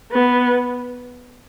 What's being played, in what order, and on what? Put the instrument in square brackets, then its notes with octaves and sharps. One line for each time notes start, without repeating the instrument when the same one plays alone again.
[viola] B3